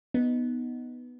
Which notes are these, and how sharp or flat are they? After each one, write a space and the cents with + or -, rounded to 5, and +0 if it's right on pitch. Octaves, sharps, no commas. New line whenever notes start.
B3 +0 D#4 +0